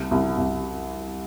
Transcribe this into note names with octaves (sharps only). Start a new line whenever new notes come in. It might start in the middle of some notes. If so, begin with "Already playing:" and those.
Already playing: C2
C2
C2